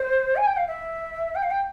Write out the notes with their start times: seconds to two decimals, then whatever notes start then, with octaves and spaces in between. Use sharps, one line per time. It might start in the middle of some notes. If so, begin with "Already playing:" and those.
Already playing: C5
0.36 G#5
0.46 G5
0.57 F5
0.67 E5
1.35 G5
1.43 F5
1.51 G5